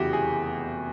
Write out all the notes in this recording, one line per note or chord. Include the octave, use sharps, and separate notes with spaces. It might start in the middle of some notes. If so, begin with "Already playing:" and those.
Already playing: F1 E2 C#3 E3 F#4 G4
G#4